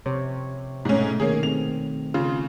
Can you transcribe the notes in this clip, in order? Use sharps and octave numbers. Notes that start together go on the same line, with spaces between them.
C3 F3 C#5
G#2 B2 A3 C#4
D#3 A#3 C#4 G#4
C4 D#4 F7
C#3 F4